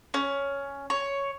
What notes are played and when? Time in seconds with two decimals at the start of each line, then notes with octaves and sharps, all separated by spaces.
0.14 C#4
0.90 C#5